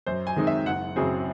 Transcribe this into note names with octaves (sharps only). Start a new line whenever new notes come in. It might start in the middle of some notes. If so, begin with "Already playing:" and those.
F#2 C5
G#5
D#3 G#3 C4 D#4
E5
F#1 F#5
F#2 C#3 F#3 C4 G#4